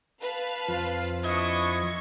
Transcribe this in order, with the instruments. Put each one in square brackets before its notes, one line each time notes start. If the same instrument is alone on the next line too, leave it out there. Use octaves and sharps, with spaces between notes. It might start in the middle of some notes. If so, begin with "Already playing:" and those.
[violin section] B4 F5 A5
[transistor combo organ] F2 F3 [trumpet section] F4
[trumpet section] D4 E4 D#5 [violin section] C#6 G#6